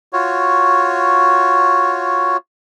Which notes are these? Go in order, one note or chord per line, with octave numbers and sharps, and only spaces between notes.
F4 F#4 C#5